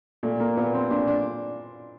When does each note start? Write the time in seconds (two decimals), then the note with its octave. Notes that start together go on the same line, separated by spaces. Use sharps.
0.23 A#2 A3
0.40 A#3
0.57 A#2 B3
0.74 C4
0.91 A#2 D4
1.07 D4